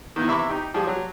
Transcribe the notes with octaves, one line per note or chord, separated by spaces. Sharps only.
D#3 B3 E4
C3 E3 E5 B5 C#6 D6
D#4 G4
F3 G3 G4 G#4
F#3